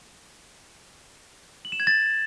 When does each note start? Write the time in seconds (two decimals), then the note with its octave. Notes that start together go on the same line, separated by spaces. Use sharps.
1.65 F#7
1.72 E7
1.80 G#6
1.87 A6